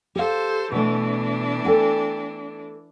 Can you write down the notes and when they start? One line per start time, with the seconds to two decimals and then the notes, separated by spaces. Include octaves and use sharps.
0.15 G4 A4 C5 F5
0.72 B2 E3 A3 D4
1.65 A4 G5 G#5